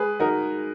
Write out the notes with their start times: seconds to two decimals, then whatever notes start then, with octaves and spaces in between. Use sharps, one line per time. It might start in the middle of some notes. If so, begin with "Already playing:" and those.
Already playing: G#3 G#4 B4
0.20 D#4 F#4 A#4